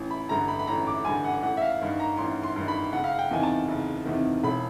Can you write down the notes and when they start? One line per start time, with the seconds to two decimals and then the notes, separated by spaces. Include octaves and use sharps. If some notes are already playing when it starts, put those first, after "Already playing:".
Already playing: A1
0.10 B5
0.29 G2 D3 A#5
0.48 B5
0.59 B5
0.67 A1 A#5
0.87 D6
1.05 G2 D3 G#5
1.24 F#5
1.43 A1 F#5
1.57 E5
1.62 F5
1.81 G2 D#3
2.00 A#5
2.18 A1 C6
2.43 C6
2.56 G2 D#3
2.68 B5
2.93 F#1 F#5
3.04 F5
3.12 F#5
3.19 G5
3.31 E2 C3 D#3 G#5
3.43 A5
3.68 F#1
4.05 E2 C3 D#3
4.44 E1 B5